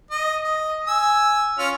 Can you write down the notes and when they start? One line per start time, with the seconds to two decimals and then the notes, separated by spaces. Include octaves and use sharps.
0.11 D#5
0.41 D#5
0.87 G#5 E6
1.59 C#4 F4 F6